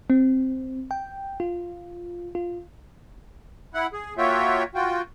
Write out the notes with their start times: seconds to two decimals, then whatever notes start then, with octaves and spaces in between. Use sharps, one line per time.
0.10 C4
0.91 G5
1.40 F4
2.35 F4
3.74 E4 F#5
3.93 G#4
4.18 A#3 F4 F#4 C#5 E5 G5
4.75 F4 F#4 G5